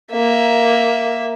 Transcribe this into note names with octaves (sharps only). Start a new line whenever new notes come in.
A#3 E5